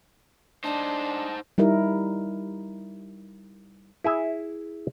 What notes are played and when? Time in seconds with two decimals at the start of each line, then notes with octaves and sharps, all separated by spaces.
0.64 D4 D#4 C5 A5
1.58 G3 D#4 E4 A#4
4.04 E4 G#4 E5